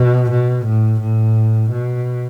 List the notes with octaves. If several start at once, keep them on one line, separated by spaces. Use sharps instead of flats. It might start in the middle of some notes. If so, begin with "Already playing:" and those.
Already playing: B2
B2
A2
A2
B2